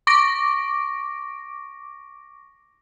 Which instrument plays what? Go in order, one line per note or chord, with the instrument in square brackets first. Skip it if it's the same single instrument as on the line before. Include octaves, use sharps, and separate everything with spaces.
[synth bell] C#6 D6 A#6 D7